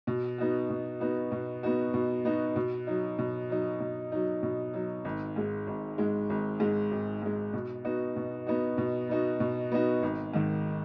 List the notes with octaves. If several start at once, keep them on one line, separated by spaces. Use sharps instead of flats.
B2
B3 D#4 F#4
B2
B3 D#4 F#4
B2
B3 D#4 F#4
B2
B3 D#4 F#4
B2
F#3 D#4
B2
F#3 D#4
B2
F#3 D#4
B2
F#3 D#4
G#1
G#2 G#3
G#1
G#2 G#3
G#1
G#2 G#3
G#1
G#2 G#3
B2
B3 D#4 F#4
B2
B3 D#4 F#4
B2
B3 D#4 F#4
B2
B3 D#4 F#4
G#1
G#2 D#3